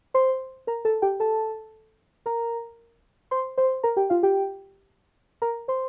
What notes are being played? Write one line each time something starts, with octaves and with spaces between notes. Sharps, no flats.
C5 C6
A#4 A#5
A4 A5
G4 G5
A4 A5
A#4 A#5
C5 C6
C5 C6
A#4 A#5
G4 G5
F4 F5
G4 G5
A#4 A#5
C5 C6